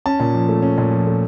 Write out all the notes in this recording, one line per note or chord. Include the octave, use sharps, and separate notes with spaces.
C#4 A5
A#2
F3
A3
C#4
A#2
F3
A3